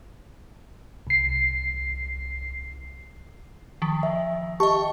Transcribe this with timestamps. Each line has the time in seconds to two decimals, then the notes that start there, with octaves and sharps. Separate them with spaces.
1.07 C2 C7
3.82 D#3 F3
4.03 E5
4.60 G4 D#5 A5 C#6